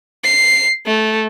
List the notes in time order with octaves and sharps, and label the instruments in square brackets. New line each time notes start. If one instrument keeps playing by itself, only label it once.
[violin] C7
A3